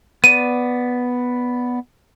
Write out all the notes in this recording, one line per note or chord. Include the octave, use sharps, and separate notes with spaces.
B3 D5 D#7